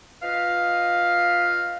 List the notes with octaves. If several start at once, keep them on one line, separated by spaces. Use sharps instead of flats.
F4 B4 D#5 F5